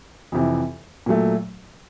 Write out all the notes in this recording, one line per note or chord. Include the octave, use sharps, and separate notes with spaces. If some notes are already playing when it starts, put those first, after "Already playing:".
F2 C3 E3
A#2 F#3 A3